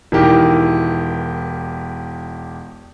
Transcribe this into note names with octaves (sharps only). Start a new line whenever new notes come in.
E1 D#3 E3 E4 G4 A#4